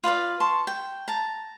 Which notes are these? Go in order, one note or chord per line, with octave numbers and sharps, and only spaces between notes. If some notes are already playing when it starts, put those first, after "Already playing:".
F4 B4 D5 F5
A5 C6 C#6
G5
A5 A#5